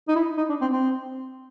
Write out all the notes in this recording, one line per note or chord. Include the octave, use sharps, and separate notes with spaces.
D#4
E4
D#4
D4
C4
C4